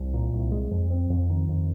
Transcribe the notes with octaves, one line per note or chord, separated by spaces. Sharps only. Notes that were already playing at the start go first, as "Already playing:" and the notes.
Already playing: C2
A#2
C2
G#3
F2
C4
F2
D#3
F2